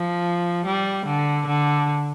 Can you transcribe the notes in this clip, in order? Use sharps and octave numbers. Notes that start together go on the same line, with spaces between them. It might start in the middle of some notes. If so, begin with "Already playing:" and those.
Already playing: F3
G3
D3
D3